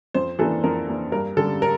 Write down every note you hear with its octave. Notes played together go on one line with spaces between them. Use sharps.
F2 C5
E3 A#3 D4 A4
F2 A#4
E3 A#3 D4
G2 A#4
D3 G3 A4
A#4